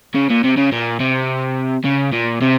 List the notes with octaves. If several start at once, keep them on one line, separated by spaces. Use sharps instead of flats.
C#3
A#2
C3
C#3
A#2
C3
C#3
A#2
C3